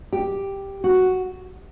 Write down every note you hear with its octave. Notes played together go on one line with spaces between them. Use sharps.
G4
F#4